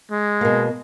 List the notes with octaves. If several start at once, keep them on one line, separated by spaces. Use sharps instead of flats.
G#3
B2 A#3